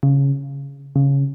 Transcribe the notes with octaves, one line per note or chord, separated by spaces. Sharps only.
C#3
C#3